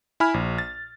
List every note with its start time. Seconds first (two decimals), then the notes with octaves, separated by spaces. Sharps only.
0.20 E4 G#5 B5 F6
0.34 A#1
0.58 A6